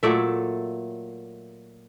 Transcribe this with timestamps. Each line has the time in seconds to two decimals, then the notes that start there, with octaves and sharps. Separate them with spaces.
0.03 A#2 F#3 A3 D5 E5